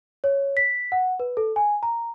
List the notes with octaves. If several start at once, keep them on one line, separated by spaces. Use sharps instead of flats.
C#5
B6
F#5
B4
A4
G#5
A#5